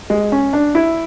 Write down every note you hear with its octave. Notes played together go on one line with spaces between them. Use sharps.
G#3
C#4
D4
E4